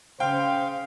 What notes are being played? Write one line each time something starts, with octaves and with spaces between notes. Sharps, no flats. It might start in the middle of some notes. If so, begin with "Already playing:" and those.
C#3 C5 F5 G5